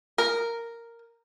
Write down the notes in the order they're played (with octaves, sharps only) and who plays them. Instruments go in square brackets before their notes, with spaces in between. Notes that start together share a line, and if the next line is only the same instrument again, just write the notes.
[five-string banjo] A#4